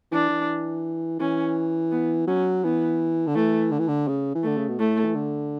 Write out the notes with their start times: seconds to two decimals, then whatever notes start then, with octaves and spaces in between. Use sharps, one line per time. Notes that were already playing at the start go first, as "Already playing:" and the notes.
0.12 E3 D4
0.29 E3
1.20 E3 C#4
1.92 B3
2.27 F#3 C#4
2.64 E3 B3
3.27 D3
3.35 E3 A3
3.71 D3
3.79 E3
3.88 D3
4.08 C#3
4.35 E3
4.43 D3 A3
4.57 C#3
4.69 B2
4.79 A2 A3
5.05 E3
5.15 D3